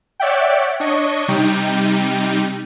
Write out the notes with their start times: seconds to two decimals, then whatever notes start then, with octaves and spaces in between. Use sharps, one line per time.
0.20 C#5 D5 E5 F#5 G5
0.80 D4 C#5 D#5 C#6
1.28 C3 G3 D#4 G5